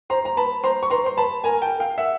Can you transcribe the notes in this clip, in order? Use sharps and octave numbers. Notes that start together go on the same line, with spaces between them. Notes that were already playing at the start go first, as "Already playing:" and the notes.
C5 A#5 C6
A#5
B4 A5 B5
C5 A#5 C6
C#6
B4 A#5 C6
C5
C6
B4 A5 B5
A#4 G#5 A#5
G5 A5
F5 G5
E5 F#5